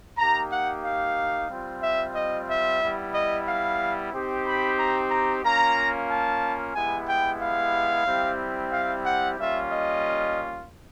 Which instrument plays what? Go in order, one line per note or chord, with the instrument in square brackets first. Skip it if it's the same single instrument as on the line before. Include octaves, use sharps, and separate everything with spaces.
[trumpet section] A#3 D#4 G4 A#5
F#5
F5
G3 C4 F4
E5
D#5
E5
G3 B3 E4
D#5
F5
C4 D#4 G4
B5
A#5
A#5
A#3 C#4 F4 A#5
A5
G#3 B3 E4 G4 G#5
G5
F5
G3 C4 E4 G4
F5
F#5
G3 A#3 C#4 F4 E5
D#5